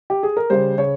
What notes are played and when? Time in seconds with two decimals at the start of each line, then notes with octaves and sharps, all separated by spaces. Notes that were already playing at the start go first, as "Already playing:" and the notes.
0.10 G4
0.23 G#4
0.37 A#4
0.50 C#3 G3 C5
0.78 C#3 C#5